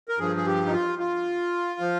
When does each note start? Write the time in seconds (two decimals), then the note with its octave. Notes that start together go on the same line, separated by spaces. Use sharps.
0.09 A#4
0.19 G2 F3 G#4
0.36 G#4
0.46 G4
0.66 D#4
0.72 F4
0.99 F4
1.80 F3